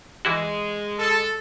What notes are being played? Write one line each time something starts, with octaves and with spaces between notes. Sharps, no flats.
E3 G#3 E4 F#4
A4